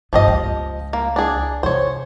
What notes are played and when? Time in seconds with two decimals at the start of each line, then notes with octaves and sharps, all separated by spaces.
0.13 G2 F3 B3 G4 D#5
0.28 C#2
0.93 A#3
1.16 D4 G#4
1.63 C3 E3 C5 C#5